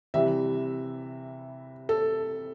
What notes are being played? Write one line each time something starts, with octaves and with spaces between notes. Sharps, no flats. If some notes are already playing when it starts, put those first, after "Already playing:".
C3 E3 G3 E5
A4